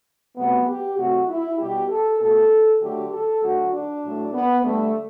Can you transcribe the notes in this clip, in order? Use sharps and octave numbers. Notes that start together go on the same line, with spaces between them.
C3 F#3 A3 B3
G4
C3 F#3 A3 F#4
E4
B2 G3 G4
A4
B2 A3 A4
D3 F#3 A3 G4
A4
D3 F#3 A3 F#4
D4
A2 F#3 A3
B3
D3 G3 A3